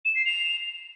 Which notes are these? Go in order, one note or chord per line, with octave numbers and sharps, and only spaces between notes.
E7
C7
F7